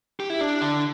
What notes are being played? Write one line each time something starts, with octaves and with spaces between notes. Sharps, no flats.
G4
E4
D4
D3